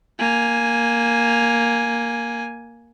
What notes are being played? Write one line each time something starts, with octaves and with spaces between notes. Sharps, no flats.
A#3 G#5